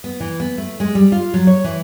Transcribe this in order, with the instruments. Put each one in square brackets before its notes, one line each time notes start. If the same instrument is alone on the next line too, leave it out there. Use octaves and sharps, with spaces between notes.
[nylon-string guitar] B3
E3
B3
A3
G#3
G3
F4
F#3
C#5
E3